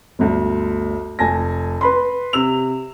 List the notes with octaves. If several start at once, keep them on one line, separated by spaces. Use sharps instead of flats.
G1 D2
F1 G#5 A5 A#6
B4 B5 C6
C3 E6 F7